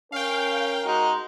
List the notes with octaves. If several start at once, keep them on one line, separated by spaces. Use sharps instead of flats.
C#4 A#4 F5 G5
G#3 D#4 F#4